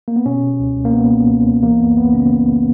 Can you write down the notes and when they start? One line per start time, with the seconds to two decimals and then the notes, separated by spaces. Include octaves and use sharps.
0.08 A#3
0.16 B3
0.26 B2 C#4
0.42 B2
0.60 C#2
0.77 C#2
0.85 A#3
0.94 B2 B3
1.11 B2
1.29 C#2
1.46 C#2
1.63 E3 A#3
1.80 F#2 B3
1.97 G#1 B3
2.14 C#3 C#4